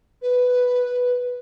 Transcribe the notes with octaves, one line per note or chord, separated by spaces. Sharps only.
B4